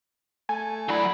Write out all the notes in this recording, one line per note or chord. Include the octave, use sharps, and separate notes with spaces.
A3 G#5
F#3 D4 E4 B5